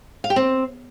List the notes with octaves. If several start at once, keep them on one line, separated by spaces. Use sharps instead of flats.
F5
G4
C4